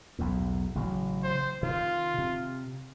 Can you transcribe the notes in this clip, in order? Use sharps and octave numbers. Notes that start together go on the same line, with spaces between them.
B1 E2 A2
A1 C#3 F#3
C5
C3 D#3 F4
C3